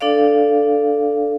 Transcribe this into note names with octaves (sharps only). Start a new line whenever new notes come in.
D4 A4 D5 F5